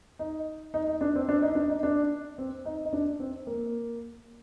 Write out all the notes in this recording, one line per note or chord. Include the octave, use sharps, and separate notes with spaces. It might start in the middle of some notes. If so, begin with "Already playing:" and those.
D#4
D#4
D#4
D4
C4
D4
D#4
D4
D#4
D4
C4
D#4
D#4
D4
C4
A#3